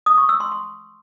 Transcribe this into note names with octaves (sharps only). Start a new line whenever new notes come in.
D#6
C#6
E6
C6
C6